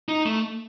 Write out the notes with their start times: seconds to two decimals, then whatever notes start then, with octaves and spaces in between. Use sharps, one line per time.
0.09 D#4
0.26 A3